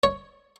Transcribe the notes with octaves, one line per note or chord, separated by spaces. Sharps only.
C#5